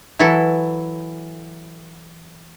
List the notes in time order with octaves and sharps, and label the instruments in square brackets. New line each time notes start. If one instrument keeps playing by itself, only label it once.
[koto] E3 F#3 E4 A4